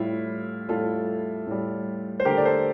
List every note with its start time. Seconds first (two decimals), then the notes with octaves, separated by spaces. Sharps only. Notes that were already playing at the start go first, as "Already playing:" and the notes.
Already playing: A2 G3 E4 F4 G4
0.68 A2 G3 F4 A4
1.47 A2 G3
2.20 C5
2.25 D3 A3 G4 A#4
2.37 D5
2.45 A4 C5